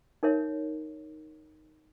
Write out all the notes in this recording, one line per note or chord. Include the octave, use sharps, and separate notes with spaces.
D#4 A#4 C#5 E5